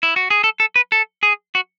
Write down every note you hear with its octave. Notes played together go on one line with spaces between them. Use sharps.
E4
F#4
G#4
A4
A4
B4
A4
G#4
F#4